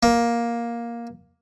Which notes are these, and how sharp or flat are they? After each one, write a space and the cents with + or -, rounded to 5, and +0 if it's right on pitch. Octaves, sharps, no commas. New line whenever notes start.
A#3 +10